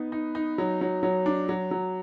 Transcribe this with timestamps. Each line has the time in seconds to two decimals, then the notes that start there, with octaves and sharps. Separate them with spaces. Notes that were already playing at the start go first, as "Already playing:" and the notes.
Already playing: B3 D#4
0.12 D#4
0.35 D#4
0.58 F#3
0.81 F#3
1.03 F#3
1.26 D4
1.49 F#3
1.71 F#3